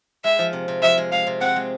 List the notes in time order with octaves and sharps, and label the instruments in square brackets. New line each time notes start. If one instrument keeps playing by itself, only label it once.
[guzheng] G#3 [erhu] E5
[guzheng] F3
C3
C3
[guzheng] F3 [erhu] E5
[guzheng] G#3
[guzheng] G#3 [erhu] F5
[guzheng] C3
[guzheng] C4 [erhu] F#5
[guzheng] G#3